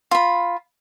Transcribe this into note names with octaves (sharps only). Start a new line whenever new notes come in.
F4 B5